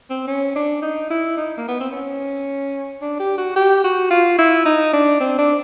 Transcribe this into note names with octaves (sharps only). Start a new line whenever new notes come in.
C4
C#4
D4
D#4
E4
D#4
A#3
B3
C4
C#4
D4
G4
F#4
G4
F#4
F4
E4
D#4
D4
C4
D4